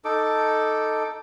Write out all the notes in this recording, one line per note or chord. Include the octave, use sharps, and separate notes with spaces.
D#4 A4 D6